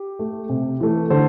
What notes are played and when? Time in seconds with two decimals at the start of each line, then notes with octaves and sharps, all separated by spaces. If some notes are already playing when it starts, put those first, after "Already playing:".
Already playing: G4
0.19 A3
0.49 C3
0.80 E3 A3
1.10 D3 A4 C5